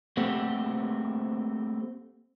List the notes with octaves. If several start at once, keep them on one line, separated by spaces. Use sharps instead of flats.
A3 A#3 C4 G4 A4 F#5